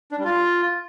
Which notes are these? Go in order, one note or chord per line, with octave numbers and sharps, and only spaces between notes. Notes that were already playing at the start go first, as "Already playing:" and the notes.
D4
G3
F4